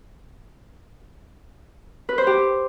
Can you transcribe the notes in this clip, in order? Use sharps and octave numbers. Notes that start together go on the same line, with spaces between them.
B4
C5
G4